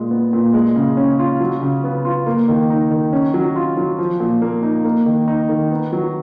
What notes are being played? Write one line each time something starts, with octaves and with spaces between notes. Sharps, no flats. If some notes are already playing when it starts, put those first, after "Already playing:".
Already playing: A#2 G#3
B3
A#2
G#3
C#3
C#4
F4
F#3
C#3
B3
F4
A#3
D#3
D#4
D#3
C#4
F#3
F4
F#3
F3
A#2
A#3
D#4
A#3
D#3
D#4
D#3
B3
F#3